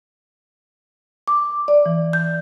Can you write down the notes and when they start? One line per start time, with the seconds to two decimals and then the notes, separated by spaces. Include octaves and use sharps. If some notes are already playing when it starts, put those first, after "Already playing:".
1.28 D6
1.68 D5
1.86 E3
2.13 G6